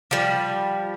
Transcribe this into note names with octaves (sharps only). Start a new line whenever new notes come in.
F3 G3